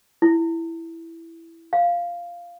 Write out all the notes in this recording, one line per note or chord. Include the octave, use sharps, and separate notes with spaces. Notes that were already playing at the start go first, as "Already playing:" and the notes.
E4
F5